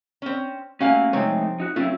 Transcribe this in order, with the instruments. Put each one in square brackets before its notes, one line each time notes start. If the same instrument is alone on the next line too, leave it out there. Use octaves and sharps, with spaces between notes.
[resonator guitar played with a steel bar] C4 C#4
[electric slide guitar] A3 A#3 C#4 [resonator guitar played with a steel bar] F#4 F5 G#5
[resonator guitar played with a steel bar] C3 C4 [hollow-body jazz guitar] F3 C#5 [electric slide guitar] G#3 A3 D#4
[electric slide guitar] D#4 F#4
[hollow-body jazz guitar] F#3 C4 F4 [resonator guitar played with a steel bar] A3 [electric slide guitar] C#4 E4